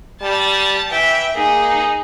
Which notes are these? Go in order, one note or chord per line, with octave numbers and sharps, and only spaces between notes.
G3 A5
E3 E5 G5
A#3 D#4 G#4